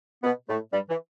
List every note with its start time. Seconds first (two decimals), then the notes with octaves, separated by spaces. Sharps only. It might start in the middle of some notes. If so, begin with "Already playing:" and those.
0.24 B2 B3
0.49 A2 A3
0.73 G2 G3
0.90 E3